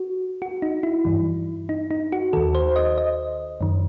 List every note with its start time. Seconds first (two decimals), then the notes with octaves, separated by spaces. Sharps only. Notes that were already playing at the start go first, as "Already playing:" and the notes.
Already playing: F#4
0.42 F#4
0.62 D#4
0.83 E4
1.05 G2 E3
1.69 D#4
1.91 D#4
2.12 F#4
2.33 D#2 D#3 A4
2.55 C5
2.76 D#5
2.98 D#5
3.61 F#2 D#3